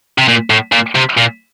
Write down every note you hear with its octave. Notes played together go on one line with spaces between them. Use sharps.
C3
A#2
A2
A#2
C3
A#2